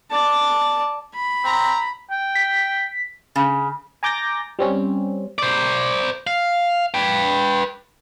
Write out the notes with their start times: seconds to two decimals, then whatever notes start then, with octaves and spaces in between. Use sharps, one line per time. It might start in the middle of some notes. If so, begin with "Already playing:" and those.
0.11 D5 A5
1.15 B5
1.45 C4 A#5
2.11 G5
2.35 B6
3.36 C#3
4.03 G#5 A#5 D6 G6 A6 A#6
4.59 G3 C4 C#4
5.38 C5 D5
6.27 F5
6.94 B4 G5